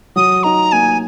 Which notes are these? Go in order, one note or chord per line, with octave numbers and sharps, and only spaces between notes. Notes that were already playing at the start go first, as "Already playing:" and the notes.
F#3 D#6
D#4 A#5
A#3 G#5